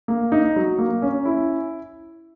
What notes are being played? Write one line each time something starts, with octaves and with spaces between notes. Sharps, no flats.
A#3
D#4
F#3
A#3
C#4
E4